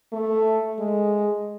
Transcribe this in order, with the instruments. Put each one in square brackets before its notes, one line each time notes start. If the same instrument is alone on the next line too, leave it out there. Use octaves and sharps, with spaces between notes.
[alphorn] A3
G#3